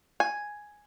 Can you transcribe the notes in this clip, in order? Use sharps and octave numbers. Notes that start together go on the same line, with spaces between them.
G#5